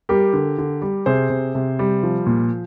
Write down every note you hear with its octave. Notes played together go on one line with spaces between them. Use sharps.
G3 G4 A#4
D3
D3
G3
C3 G#4 C5
C3
C3
G3
F3
A#2